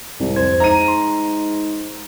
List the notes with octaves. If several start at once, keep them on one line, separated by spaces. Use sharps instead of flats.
C2 G#2
F2 C5 G#6
G#2 A#5 D#7
C6